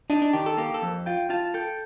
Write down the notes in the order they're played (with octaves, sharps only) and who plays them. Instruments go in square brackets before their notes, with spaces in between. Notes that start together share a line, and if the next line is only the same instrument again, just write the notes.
[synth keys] D4 [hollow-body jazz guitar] D#4
[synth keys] D4
[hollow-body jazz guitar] D#3 [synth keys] G4
[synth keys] A4
[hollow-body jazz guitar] A#3 [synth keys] G4
[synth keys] A4
[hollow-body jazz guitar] F2
[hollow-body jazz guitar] F4 [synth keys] G5
[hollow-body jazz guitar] F4 [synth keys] A5
[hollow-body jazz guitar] A4 [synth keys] G5